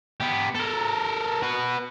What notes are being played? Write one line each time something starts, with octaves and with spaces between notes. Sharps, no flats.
B3 G4
A4 A#4
F#4 B4